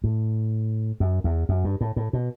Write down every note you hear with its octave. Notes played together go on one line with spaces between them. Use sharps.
A2
F#2
E2
F#2
G2
A2
A2
B2